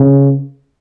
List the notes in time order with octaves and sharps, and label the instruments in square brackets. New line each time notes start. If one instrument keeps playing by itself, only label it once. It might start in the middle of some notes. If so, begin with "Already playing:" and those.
Already playing: [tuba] C#3